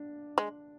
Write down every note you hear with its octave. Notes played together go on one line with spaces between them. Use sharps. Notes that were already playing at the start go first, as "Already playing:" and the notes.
Already playing: D4
G#3